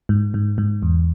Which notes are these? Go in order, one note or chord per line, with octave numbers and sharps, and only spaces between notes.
G#2
G#2
G#2
E2